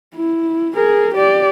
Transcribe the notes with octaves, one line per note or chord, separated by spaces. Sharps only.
E4
G#4 A#4
G4 D5